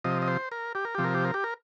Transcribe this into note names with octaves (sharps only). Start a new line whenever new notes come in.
C3 F3 D#5
D#5
C5
A#4
G4
A#4
C3 F3 G4
A#4
G4
A#4
G4
A#4